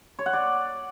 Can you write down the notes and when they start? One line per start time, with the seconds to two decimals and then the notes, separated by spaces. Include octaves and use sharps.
0.19 C#5
0.26 F#5
0.33 D5